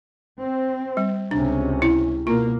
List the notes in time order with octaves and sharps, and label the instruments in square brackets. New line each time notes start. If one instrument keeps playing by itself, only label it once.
[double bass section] C4
[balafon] G3
[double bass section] C#2 C3 C#4 [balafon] D4
[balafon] E4
[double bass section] B2 A#3 [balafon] F4